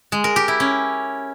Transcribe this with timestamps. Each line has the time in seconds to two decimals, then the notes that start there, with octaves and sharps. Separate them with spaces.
0.12 G#3
0.24 A#4
0.36 G4
0.48 E4
0.60 C#4